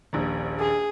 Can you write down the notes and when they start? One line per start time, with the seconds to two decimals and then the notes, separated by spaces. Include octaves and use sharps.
0.13 D#1 A#1
0.60 G#4